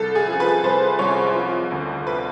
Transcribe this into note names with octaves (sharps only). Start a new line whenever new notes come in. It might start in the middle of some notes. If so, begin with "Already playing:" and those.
Already playing: C2 A4
G#4
F3
B4
C2 C5
C2 C#5
F3
D2
B4